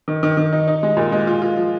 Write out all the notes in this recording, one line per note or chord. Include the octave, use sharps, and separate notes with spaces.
D#3
D#3
D#3
D#4
D#4
G#3
A#2
G#3
F4
F4
F3